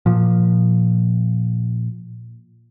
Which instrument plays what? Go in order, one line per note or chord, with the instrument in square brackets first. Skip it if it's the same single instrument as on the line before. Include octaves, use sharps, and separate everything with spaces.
[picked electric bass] A#2 F3